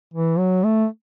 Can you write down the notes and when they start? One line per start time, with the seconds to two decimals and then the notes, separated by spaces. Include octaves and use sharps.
0.14 E3
0.38 F#3
0.64 A3